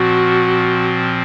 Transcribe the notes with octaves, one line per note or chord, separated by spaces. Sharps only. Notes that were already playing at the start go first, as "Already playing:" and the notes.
Already playing: A#2 F3 C4 F#4